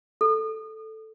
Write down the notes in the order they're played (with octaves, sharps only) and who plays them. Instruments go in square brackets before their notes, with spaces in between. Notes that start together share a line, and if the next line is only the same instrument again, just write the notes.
[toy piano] A4